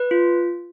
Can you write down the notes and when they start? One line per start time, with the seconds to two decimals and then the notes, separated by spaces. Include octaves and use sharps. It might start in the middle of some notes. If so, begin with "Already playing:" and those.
Already playing: B4
0.11 F4